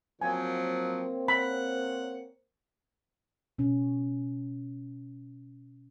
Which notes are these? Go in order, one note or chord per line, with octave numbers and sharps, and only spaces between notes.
F3 F#3 A#3 C4 C#5 G#5
F#5 B5
B2 C#4